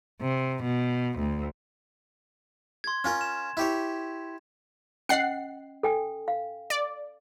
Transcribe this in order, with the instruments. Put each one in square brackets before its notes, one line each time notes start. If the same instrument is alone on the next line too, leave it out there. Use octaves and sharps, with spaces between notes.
[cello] C3
B2
D2
[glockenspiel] C6 G#6
[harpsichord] C#4 F4 A#4
[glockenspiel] E7
[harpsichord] E4 G4 C#5
[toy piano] C#4 D#5 G5 [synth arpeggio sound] F#5 C7
[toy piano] A4 G5 G#5
F5
[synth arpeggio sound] D5